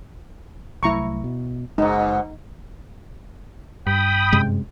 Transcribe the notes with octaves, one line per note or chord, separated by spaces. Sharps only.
C2 F#3 A3 E4 A#5 C#6
B2
F#1 G#2 B2 G#3 D#4
G2 G5 B5 D#6
F#2 C3 G#3